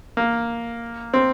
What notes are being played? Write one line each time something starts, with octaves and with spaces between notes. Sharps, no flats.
A#3
C4